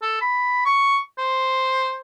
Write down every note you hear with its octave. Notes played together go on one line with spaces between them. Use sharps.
A4
B5
C#6
C5